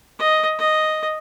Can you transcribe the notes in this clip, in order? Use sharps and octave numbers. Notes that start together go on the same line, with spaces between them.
D#5
D#5